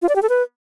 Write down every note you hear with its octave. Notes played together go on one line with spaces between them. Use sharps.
F4
D5
G4
A4
B4